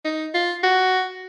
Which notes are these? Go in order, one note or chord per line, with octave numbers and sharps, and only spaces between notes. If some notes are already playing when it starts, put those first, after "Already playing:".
D#4
F4
F#4